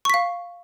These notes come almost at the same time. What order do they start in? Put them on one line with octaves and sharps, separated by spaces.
C#6 B6 F5